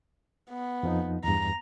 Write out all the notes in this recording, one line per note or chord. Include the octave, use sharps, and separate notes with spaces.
B3
F2 F3 D#4
E2 G2 A#5